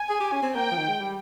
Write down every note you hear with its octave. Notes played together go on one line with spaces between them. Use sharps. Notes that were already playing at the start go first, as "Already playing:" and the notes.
Already playing: G#5
G#4
G4
C#4
C4
A#3 G5
F3
D#3
G#3
G3